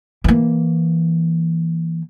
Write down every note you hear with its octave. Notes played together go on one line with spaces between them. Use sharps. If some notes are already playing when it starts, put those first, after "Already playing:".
E3 A#3